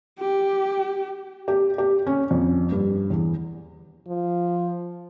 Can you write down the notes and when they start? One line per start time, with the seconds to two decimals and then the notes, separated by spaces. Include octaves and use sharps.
0.19 G4
1.48 G4
1.78 G4
2.07 C#4
2.31 F2
2.72 G2
3.10 E2
4.08 F3